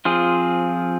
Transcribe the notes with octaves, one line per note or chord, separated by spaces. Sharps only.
F3 C4 F4 G#4